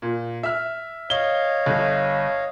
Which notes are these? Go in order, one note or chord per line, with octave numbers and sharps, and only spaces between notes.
A#2
E5 F6
C#5 D#5 F5 G7
G1